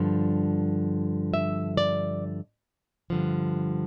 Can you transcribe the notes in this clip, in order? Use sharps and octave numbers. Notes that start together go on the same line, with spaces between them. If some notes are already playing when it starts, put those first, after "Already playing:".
Already playing: G2 D3 F3
E5
D5
G2 D3 F3